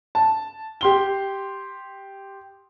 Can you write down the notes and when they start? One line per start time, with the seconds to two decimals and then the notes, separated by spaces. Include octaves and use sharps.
0.15 A5
0.81 G4 C6 G7